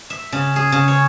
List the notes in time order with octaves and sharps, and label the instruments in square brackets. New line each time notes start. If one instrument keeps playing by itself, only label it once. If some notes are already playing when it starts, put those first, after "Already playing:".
[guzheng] E5
C#3
G#4
C#3
C#5